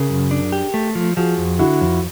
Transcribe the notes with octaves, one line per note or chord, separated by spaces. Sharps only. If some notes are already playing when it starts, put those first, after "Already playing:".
Already playing: C#3 G#4 A#4
F#2
D4
G4
A3
F3
F3 F#4 G#4
F2
D3 E4 F#4
F2